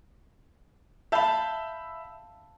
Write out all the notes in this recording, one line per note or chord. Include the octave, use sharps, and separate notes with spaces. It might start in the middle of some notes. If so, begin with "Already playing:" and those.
E5 F5 A5 B5 G6